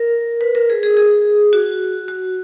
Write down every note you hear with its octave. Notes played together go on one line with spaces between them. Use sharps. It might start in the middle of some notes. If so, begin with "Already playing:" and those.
Already playing: A#4
B4
A#4
G#4
G#4
G#4
F#4
F#4